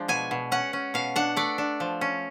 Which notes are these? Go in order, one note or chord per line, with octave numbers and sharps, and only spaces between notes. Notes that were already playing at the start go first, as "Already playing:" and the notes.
Already playing: F3 G#3 D4
B2 G#5
B2
C#4 F#5
C#4
B2 F5
D4 F#5
A3 D5
D4
F3
C#4